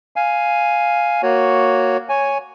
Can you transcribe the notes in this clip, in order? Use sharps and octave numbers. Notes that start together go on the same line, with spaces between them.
F5 G#5
A#3 F#4 C#5
C#5 G#5